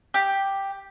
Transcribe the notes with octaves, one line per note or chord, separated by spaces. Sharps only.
G4